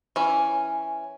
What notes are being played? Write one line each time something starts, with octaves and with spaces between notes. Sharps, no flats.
E3 C#4